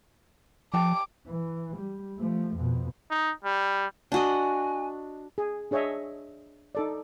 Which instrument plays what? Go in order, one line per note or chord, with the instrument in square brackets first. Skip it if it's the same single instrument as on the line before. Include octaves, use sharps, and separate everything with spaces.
[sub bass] F3 [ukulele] G4 A5 [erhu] D6
[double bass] E3
G3
F3 A3
F2 B2
[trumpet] D#4
G3
[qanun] D4 F#4 D#5 [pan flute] G#5
[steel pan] G#4
D4 G#4 C#5 D#5 E5
D#4 A4 D5